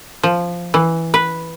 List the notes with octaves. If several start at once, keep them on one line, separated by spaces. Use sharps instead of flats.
F3
E3
B4